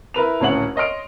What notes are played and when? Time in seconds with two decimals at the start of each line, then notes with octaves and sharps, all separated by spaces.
0.14 E4 A#4 B4 F7
0.40 D#1 D2 A2 C#4 F#5 F#7
0.76 C#5 D#5 C6 F6 D7